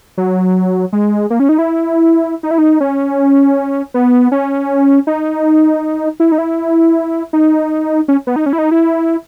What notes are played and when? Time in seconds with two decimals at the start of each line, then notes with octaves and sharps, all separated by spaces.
0.17 F#3
0.93 G#3
1.30 A#3
1.40 C#4
1.49 D#4
1.58 E4
2.43 D#4
2.51 E4
2.58 D#4
2.81 C#4
3.94 B3
4.32 C#4
5.07 D#4
6.20 E4
6.32 D#4
6.38 E4
7.33 D#4
8.08 C#4
8.27 B3
8.36 D#4
8.46 C#4
8.53 E4
8.58 D#4
8.71 E4